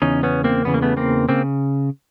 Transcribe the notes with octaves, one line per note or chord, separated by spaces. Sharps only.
E2 C#3 C#4 D#4
B3 C#4
A#3 C4
E2 C#3 E3 B3
A#3
A3 B3
A#3 C4
C#3 A#3 C4